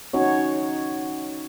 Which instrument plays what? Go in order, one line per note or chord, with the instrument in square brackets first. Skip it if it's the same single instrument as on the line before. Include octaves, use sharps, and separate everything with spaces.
[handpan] C#4 D#4 F#4 C#5